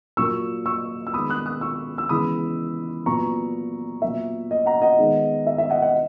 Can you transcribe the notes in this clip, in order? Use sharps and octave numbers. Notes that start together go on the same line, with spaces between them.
A#2 F#3 A#3 C#6 E6
C#6 E6
E6
D#3 G#3 B3 B5 D#6
D#6 F#6
D#6 F#6
C#6 E6
E6
C#3 E3 G#3 B3 B5 D#6
A#2 F#3 B3 A#5 C#6
A#2 F#3 B3 E5
D#5
F#5 A#5
D#5 F#5
D#3 G#3 B3
E5
E5
D#5 F#5
D#5 F#5